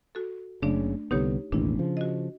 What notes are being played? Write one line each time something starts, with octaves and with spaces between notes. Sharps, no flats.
F#4 A4
F#1 C#3 A3 D4 D5
C2 D3 B3 D#4 G4 C#5
E1 A1 D#2 D4 E4
C#3 F3
F#4 D#5